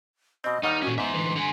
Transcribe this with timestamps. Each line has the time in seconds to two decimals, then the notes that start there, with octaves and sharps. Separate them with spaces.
0.44 B2 C4 D#5
0.63 D#2 D#3 G3 D#4 F#5
0.82 A#2 C#4 F#4
0.98 G#2 B3 E5 C6
1.14 D3 E3 B4
1.36 D3 F#5 G#5